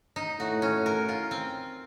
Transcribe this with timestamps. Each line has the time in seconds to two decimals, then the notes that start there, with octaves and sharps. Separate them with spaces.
0.16 D#4
0.39 A2 F#4
0.62 C#4
0.86 A#4
1.09 F4
1.31 C4